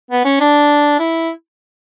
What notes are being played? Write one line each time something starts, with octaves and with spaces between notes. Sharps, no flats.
B3
C#4
D4
E4